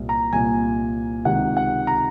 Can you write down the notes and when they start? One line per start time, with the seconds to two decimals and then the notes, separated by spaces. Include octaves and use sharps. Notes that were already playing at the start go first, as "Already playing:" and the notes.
Already playing: C2 A#2
0.09 A#5
0.32 C2 A#2 G#5
1.25 C#2 C3 D#3 F#5
1.57 F#5
1.87 A#5